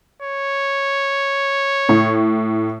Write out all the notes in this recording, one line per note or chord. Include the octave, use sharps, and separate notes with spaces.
C#5
A2